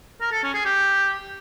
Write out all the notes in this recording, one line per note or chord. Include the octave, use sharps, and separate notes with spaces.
A#4
A4
C#4
G#4
G4